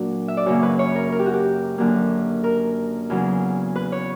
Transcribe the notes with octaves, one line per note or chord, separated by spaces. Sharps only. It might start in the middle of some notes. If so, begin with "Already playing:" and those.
Already playing: A#2 F#3 D4
E5
D5
F#2 C#3 F#3 A#3 C#5
B4
C#5
A#4
A#4
G4
F#4
G4
F#2 D3 F#3 A#3
A#4
E2 C#3 F#3
B4
C#5